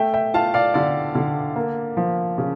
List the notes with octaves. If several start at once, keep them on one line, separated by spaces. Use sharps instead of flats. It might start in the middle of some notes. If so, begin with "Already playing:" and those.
Already playing: A3 E5 G5
E5 G5
F4 F5 A5
D5 F5
D3 D5
D3
A#3
F3
C#3